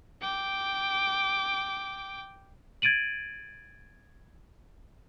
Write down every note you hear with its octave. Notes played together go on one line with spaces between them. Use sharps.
G5 D6
G#6 A6 D7 D#7 F#7